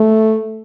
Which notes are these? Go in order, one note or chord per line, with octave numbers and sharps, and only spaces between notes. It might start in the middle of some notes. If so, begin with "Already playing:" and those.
Already playing: A3